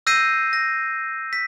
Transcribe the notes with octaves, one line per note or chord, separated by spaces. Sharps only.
E6 G6 A#6 C7 D#7
A#6
B6